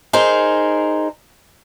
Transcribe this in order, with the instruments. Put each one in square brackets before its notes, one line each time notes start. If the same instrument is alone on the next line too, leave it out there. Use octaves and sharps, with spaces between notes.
[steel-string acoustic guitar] D#4 G#4 A#4 C5